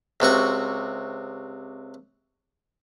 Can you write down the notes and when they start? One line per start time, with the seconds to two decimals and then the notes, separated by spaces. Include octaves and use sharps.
0.20 C#2 C3 F#4 C#6